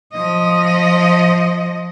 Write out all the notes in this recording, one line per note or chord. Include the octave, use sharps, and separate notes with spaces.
F3 D#5